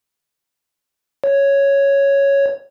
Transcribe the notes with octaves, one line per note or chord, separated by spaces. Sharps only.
C#5